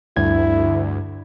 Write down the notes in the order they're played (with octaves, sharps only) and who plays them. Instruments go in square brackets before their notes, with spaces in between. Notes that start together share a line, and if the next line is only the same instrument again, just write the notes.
[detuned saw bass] D2 [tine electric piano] G2 G#6 [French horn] E4